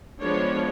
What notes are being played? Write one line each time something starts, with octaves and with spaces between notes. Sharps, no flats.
F3 G#3 B3 D4 C#5